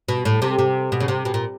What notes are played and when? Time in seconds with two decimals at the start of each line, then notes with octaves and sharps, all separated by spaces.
0.09 B2
0.25 A2
0.42 C3
0.59 C3
0.92 B2
1.00 C#3
1.08 C3
1.25 B2
1.34 A#2